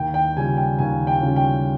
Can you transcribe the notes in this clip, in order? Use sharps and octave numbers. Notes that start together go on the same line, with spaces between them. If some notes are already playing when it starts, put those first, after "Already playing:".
Already playing: D#2 G5
G5
C#3 G3 C#4 F4 G#5
G5
D#2 G#5
G5
C#3 G3 C#4 F4
G5